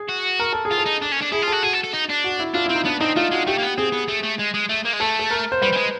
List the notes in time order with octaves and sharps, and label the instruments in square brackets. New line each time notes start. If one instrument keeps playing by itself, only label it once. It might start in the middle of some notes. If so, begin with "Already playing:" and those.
Already playing: [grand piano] G#4
[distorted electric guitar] F#4
[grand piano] A#4
A4
G#4
[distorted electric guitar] F4
[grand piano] A4
[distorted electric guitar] D#4
D4
C#4
D4
[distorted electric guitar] E4 [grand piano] G#4
[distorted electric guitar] F4
[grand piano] A4
[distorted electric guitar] F#4
[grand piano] F#4 [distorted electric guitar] G#4
[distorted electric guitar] A4
A4
D#4
D4
[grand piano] F#4
E4
[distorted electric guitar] D4 [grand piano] F4
[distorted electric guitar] C4 [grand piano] E4
[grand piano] D#4
[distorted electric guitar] B3 [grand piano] D4
[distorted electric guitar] C4 [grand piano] D#4
[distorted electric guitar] A3 [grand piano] F4
[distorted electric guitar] G#3 [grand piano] F#4
[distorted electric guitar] A3 [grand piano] G4
[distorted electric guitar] A#3
B3
[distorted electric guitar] C4 [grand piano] G#4
[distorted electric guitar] B3
A3
A3
G#3
G#3
A3
A#3
G#3
[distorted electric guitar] A3 [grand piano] A4
[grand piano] A4
A#4
C5
[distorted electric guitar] G3 [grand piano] B4
[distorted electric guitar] G3
G#3